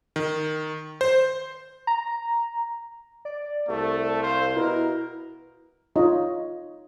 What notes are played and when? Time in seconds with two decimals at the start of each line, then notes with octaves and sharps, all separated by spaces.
0.16 D#3
1.01 C5
1.87 A#5
3.25 D5
3.69 C2 A3
4.22 C5 F5
4.56 B2 E4 A#4
5.95 D#4 F4 C#5 D#5 A#5